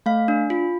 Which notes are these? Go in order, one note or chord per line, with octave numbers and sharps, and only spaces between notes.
A3 F5
D4
F4